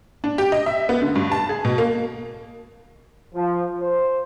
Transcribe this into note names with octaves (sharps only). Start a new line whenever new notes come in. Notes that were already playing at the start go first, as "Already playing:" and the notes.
D4
G4
D#5
E5
B3
D3
G2
A5
G#4
B2
A#3
F3
C5